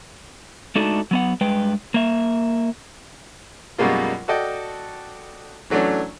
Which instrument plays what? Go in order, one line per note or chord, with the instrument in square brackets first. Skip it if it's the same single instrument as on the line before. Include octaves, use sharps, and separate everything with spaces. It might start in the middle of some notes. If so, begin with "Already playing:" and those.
[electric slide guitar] G#3 A3 D4 D#4 F#4 A4
F#3 B3 F#5
G2 G#3 B4 G5
A#3 E5
[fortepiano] F#2 B2 G3 G#3 A#3 F4
F#4 A4 D5 D#5 G5
E3 F#3 A3 C#4 D4